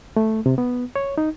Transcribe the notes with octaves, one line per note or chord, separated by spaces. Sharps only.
A3
C3
B3
C#5
D#4